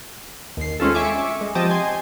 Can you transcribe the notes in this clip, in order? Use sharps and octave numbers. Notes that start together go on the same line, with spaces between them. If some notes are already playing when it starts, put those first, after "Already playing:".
D#2 C7
G#3 C4 C#4 F4 A4
E5 G#5 C#6 D6
G#3
F3 C4 G4 D#5 G5 A5
G#5 C6 G#6